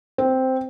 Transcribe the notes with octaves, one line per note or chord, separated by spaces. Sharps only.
C4